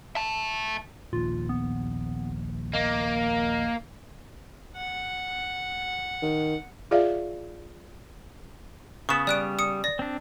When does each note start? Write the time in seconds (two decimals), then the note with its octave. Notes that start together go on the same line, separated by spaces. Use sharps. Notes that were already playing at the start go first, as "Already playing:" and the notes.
0.15 E5 A5
1.13 A#1 D#2 F4
1.49 B3
2.74 A#3 D#5
4.76 F#5
6.22 D#3
6.91 F4 G#4 D5 E5 F5
9.09 C#3 B3 C#6 E7
9.27 G3 D5 F#6 D7
9.59 D#6 C#7
9.84 D5 A#6
9.99 C4 D4